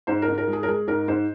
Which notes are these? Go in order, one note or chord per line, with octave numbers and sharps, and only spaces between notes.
G#2 C5
A#4
G#2
A#4
G#3
G#4
A#4
G#3 G#4
G#2 A#4
G#2 C5